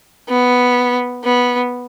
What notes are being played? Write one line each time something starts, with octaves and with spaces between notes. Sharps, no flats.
B3
B3